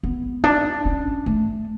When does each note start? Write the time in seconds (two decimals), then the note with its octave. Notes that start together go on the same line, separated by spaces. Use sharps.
0.03 B3
0.44 D4
0.85 C#4
1.26 A3